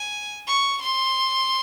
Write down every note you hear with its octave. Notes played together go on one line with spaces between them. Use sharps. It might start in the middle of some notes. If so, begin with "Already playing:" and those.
Already playing: G#5
C#6
C6